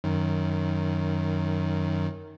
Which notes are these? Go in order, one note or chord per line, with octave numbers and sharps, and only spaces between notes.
F#2 D#3